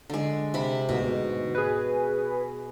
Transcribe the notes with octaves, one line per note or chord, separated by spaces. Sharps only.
D3 G#3
C3 B5
D2 G#2 B2
G#4 B4